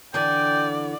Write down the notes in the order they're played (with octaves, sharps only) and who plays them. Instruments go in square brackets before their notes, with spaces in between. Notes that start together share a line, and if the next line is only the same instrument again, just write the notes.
[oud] D3 E3 D4 [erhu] D5 [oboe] G5